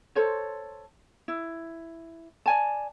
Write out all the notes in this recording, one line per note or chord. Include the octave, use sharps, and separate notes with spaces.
A4 C5 C#5
E4
D5 G#5 A5